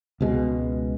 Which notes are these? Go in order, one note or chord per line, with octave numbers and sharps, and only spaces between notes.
C#2 B2 G#3